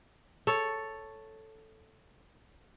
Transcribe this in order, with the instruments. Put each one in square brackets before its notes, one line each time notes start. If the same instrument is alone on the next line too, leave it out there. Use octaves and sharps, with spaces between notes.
[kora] A4 C#5